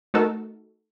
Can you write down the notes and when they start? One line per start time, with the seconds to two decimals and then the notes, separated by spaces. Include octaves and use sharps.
0.14 A3 D#4 F#4 A4 A#4